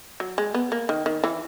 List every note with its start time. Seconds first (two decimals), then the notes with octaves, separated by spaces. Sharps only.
0.20 F#3
0.38 G#3
0.54 B3
0.72 A#3
0.89 D#3
1.06 D#3
1.24 E3